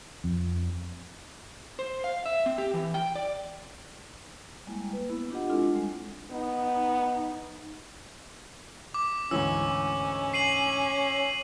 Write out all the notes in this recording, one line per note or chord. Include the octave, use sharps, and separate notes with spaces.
F2
C5
F5
E5
C4
G4
E3
G5
D5
G3 G#3 A#3 E4 G5
B4
B3 E4
D4 F4 G4 D#5 F#5
G#3 C4 D4 E4 F4 A4
G3 G#3
B3 D#4
D6
D2 G#2 E3 C#4 E6
C7 D#7 F#7